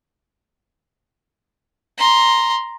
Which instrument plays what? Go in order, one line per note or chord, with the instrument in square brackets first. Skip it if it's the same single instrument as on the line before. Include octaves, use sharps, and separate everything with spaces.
[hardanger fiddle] A#5 C6